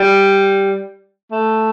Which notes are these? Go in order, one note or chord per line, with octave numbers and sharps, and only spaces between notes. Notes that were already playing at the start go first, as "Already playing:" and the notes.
Already playing: G3
A3